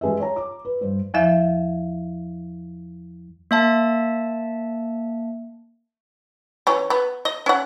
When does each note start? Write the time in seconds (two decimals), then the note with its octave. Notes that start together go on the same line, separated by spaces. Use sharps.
0.01 G#3 G#4 B4 E5
0.20 C#5 A#5
0.36 D6
0.65 B4
0.81 G2 C5
1.14 E2 F3 E5
3.51 A#3 E5 A5
6.67 E3 C#4
6.90 B3
7.25 D#5
7.46 C#4 F#5